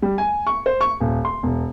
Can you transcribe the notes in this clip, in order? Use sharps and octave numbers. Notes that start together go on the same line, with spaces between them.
G3
G#5
C#6
C5
C#6
D#1
C6
E1